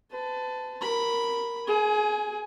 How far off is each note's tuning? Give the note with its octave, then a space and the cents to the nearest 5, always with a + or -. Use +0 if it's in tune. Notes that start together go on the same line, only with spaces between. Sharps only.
B4 +45 A5 +0
A#4 +0 B5 +0
G#4 +30 G#5 +0